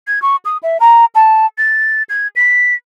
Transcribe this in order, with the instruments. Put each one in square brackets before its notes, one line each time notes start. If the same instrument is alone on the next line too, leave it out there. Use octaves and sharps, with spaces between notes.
[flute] G#6
C#6
D#6
E5
A#5
A5
A6
G#6
B6